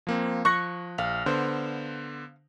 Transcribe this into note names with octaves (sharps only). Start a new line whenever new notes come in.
F3 A#3 C4
F3 C#6 F#6 A#6
A#1 F5
D3 B3 C5